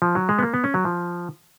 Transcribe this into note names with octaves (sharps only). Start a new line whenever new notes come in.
F3
F#3
G#3
B3
A#3
B3
C#4
F#3
F3